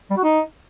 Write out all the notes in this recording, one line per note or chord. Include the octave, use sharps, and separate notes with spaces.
G3
F#4
D#4